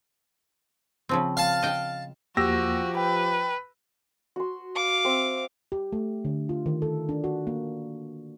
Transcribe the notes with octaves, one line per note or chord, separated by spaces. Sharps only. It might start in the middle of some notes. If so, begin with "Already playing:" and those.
C#3 F3 C4
F5 A5
D#5 G5
E2 F3 A#3 F#4 G4 E6 A#6
B4 G5
F#4 C6
F5 D6
C4 E5
G4
A3
D3
F4
D#3
A4
D4
F#4
A#3